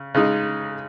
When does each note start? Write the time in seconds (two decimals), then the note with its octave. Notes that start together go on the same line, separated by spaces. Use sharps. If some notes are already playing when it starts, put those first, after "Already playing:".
Already playing: C#3
0.14 C#3 G#3 D#4